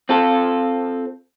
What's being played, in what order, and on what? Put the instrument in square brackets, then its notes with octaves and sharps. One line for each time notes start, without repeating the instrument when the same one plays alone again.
[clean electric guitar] C4 F4 A4